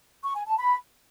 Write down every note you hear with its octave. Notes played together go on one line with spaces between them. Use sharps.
C#6
G#5
A5
B5